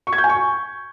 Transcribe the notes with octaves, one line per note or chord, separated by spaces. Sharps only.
C#6
G#6
G6
G#5
C#6